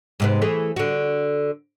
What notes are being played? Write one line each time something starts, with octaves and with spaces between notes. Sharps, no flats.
G#2 C3 B3
E3 A3 G#4
D3 F#4